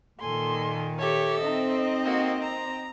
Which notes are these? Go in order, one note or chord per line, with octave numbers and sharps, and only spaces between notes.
A#2 D#3 A4 G#5 C6
G4 A4 C#5 E5
C4 D#4 D#5
A#3 F#4
A#5